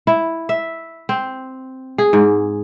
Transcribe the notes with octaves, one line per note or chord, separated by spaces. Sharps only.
E4
E5
C4
G#4
G#2